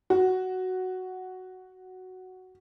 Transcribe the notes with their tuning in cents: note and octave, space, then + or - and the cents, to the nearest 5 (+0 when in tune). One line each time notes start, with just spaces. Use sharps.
F#4 +5